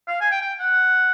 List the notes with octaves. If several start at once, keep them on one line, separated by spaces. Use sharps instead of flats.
F5
G#5
G5
G5
F#5